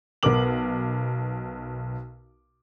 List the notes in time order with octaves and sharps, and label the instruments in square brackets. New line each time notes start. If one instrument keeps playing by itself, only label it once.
[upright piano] B1 B3 A#4 B4 D6 F#7